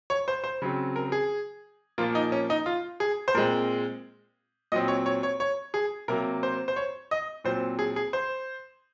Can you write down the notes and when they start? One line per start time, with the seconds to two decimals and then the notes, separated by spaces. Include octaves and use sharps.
0.10 C#5
0.28 C5
0.44 C5
0.62 C#3 F#3 C4
0.96 A#4
1.12 G#4
1.98 A#2 F3 A#3 F4
2.15 D#4
2.32 C#4
2.50 D#4
2.66 F4
3.00 G#4
3.28 C5
3.34 A#2 G#3 C4 A#4
4.72 A#2 F#3 C4 D#5
4.88 C#5
5.06 C#5
5.23 C#5
5.40 C#5
5.74 G#4
6.08 C3 F#3 A#3 A#4
6.43 C5
6.68 C5
6.76 C#5
7.11 D#5
7.44 A#2 F#3 C4 C5
7.79 G#4
7.96 G#4
8.13 C5